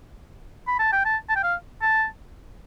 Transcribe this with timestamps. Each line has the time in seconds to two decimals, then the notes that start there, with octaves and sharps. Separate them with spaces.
0.67 B5
0.79 A5
0.92 G5
1.05 A5
1.29 A5
1.36 G5
1.43 F5
1.82 A5